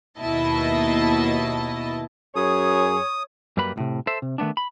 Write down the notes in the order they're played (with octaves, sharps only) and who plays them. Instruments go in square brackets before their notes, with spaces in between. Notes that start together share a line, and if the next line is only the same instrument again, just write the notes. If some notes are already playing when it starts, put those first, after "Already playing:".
[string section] D#2 B2 E4 D#5 A5
[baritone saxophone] F#2 [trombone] G#4 [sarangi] C#5 [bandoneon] D#6
[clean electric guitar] F#2 G3 A#3 B4 B5
B1 A2 C3
A4 C5 E5
C3
D#3 A3 B3 D4
B5